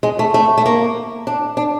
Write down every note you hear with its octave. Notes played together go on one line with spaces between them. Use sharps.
G#3
A3
A3
A3
A#3
D4
D4